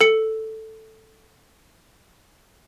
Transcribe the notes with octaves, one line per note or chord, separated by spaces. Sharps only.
A4 C#7